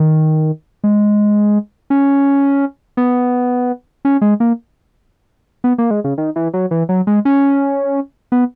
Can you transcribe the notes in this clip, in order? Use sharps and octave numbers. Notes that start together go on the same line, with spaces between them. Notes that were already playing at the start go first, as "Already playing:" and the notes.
Already playing: D#3
G#3
C#4
B3
C#4
G#3
A#3
B3
A#3
G#3
C#3
D#3
E3
F#3
E3
F#3
G#3
C#4
B3